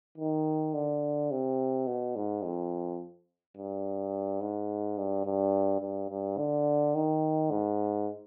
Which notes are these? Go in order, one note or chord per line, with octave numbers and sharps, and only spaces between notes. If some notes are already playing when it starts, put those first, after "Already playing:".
D#3
D3
C3
B2
G#2
F2
G2
G#2
G2
G2
G2
G2
D3
D#3
G#2